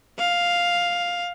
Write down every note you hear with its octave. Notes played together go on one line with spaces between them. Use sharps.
F5